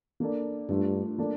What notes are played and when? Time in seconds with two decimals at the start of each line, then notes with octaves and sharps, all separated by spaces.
0.20 A#3 D4 A4 D5
0.69 G2 A3 D4 F4
1.18 A#3 D4 A4 D5